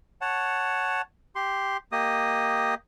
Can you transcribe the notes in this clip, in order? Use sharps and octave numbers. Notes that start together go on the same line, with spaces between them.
C#5 F#5 A5
G4 C6
A#3 G4 D#5 D#6